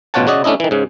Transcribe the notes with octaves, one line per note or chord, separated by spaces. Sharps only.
A1 B2 F4 C#5 F#5 A5
C#3 F#4 D5 D#5
A3 C#4 D4 E4 D#5
D#3 E3
G#2 C#3